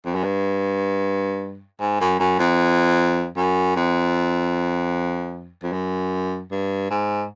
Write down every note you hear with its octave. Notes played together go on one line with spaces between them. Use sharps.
F2
F#2
G2
G#2
F#2
F#2
F2
F#2
F2
F2
F#2
G2
G#2